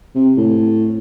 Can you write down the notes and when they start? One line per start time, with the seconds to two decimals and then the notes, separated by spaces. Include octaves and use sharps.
0.15 C3
0.37 A2